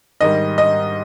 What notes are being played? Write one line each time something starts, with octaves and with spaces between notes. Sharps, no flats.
G#2 D#3 G3 D#5
D#5